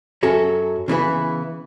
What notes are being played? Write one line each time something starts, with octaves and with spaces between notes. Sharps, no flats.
F#2 F#3 C#4 F#4 A4
C#3 E3 B3 E4 B4